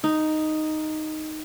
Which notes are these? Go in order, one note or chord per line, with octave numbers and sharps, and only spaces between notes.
D#4